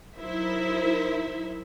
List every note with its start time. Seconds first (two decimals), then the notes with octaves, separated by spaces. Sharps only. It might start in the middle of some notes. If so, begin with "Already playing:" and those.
0.18 F#3 D#4 E4 A#4 C5 E5